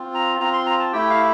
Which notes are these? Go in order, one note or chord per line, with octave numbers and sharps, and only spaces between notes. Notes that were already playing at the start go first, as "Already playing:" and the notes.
Already playing: C4 F4
A#5
C4 F4 A#5
C6
A#5
A5
A3 E4 G4 G5
F5